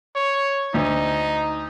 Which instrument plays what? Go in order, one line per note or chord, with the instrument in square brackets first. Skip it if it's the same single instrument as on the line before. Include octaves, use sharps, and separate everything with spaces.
[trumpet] C#5
[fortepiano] D2 [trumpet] D#4